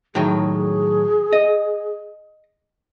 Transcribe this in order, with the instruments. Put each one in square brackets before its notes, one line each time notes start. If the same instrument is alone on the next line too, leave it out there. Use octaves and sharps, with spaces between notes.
[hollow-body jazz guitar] A2 D#3 F#3 [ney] G#4
[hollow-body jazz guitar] D#5